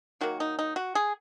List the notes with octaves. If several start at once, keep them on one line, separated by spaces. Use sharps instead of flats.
D#3 F#3 A#3 F#4
D#4
D#4
F#4
G#4